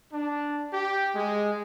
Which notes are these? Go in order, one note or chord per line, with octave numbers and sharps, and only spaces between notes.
D4
G4
G#3